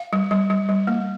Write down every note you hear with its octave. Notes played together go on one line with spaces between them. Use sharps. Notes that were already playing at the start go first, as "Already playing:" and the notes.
Already playing: F5
G3
G3
G3
G3
A#3